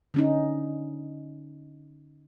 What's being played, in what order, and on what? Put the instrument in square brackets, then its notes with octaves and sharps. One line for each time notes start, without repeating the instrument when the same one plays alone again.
[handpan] D3 C#4 D#4